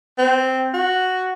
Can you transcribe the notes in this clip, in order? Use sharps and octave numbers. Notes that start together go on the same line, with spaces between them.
C4
F#4